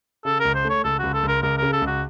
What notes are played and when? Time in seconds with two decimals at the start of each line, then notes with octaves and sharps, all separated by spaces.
0.25 C#3 A4
0.40 C#2 A#4
0.55 C5
0.65 A3 C#5
0.84 C#2 A4
0.99 C#2 F#4
1.14 A4
1.23 C#2 A#4
1.42 C#2 A#4
1.58 C#3 A#4
1.73 A4
1.82 C#2
1.87 F#4